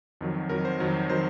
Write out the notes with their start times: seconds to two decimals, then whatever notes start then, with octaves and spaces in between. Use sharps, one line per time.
0.21 F2 D#3 F#3
0.49 F2 D#3 F#3 A#4
0.65 C5
0.80 F2 D#3 F#3 A#4
1.09 D#3 F#3 C5